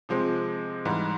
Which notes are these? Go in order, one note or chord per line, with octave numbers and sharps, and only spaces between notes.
C3 F3 G#3 C4
G#2 E3 G3